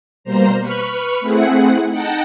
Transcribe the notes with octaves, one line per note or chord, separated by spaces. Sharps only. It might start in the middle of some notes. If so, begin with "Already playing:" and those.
B2 G3 A#3 C5 A#5
B4 B5 C#6 F6
A3 C4 E4 G#4 F#5
D#4 F#5 G5 A5 A#6